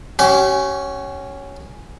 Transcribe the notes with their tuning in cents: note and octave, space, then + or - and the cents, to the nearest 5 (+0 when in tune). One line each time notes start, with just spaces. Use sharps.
C#4 +0 G4 -45